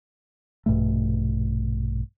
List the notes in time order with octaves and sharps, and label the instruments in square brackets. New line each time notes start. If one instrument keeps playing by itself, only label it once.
[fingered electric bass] A#1 G2 B2 A3